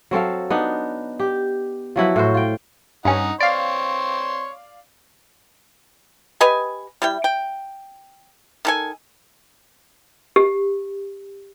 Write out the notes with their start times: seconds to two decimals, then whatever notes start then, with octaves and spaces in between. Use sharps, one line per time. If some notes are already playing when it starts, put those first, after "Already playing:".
0.11 F#3 C4 A4 F5
0.50 B3 D4 D#4
1.19 G4
1.96 F3 F#3 E4 B4
2.16 A2 F#4 C5
2.34 F4 G5
3.05 G2 C#4 D#4 F#5
3.40 C4 C#5 D5 F5 C6
6.41 G4 B4 D#5 G#5
7.02 G3 E4 G5
7.24 G5
8.65 D#3 A4 G#5
10.36 G4